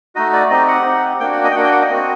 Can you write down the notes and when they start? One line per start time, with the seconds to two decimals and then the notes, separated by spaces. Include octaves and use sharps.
0.15 A3 D#4 F#4 D#5
0.33 D5
0.50 C4 D#4 G4 D#5
0.68 F#5
0.85 C4 D#4 G4
1.20 A#3 D4 F#4 G5
1.32 F#5
1.44 D#5
1.51 G5
1.55 A#3 D4 F#4 F#5
1.64 G5
1.72 F#5
1.81 D#5
1.90 C4 F#4